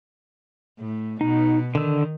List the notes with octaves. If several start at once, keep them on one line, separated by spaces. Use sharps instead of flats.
A2
B2 D#4
D3 D#3 E6